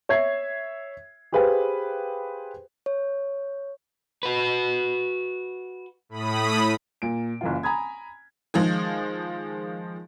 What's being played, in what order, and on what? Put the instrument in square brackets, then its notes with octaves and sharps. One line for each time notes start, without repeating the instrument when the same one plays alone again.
[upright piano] C#5 E5 G#6 C7
G4 G#4 B4 C5 F5 G5
[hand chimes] C#5
[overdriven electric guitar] F#4 B4
[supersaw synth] A2 B5 D#6
[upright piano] A#2 D7
F#1 E3 F4
G#5 A#5 B5 D#6 G#6
[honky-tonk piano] D#3 F3 G#3 G#4